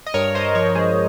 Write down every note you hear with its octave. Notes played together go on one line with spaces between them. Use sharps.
D#5
G2 A#4 C#5
G2 C5 D#5
F3 A#4 C#5
G#3 G#4 C5